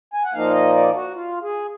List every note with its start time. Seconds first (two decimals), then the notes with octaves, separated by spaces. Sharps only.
0.14 G#5
0.24 F#5
0.34 A#2 F3 A#3 D#4 F5
0.53 D#5
0.73 D5
0.94 F#4
1.14 F4
1.42 G#4